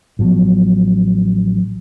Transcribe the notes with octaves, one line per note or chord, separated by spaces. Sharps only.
A1 F3 F#3 B3